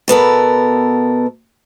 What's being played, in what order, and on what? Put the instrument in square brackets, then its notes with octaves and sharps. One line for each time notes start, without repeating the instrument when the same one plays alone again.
[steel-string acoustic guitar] B2 B3 A4 A#4